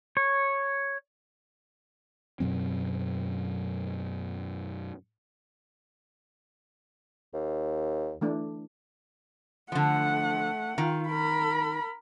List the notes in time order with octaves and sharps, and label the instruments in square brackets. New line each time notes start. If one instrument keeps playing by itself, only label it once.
[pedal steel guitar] C#5
[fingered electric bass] F#2 B2 F#3 C4
[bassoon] D#2
[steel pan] E3 A3 D4
[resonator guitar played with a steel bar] D3 F3 [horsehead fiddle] A3 F#5
[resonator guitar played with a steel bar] D#3 [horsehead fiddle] F4
[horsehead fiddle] A#4 B5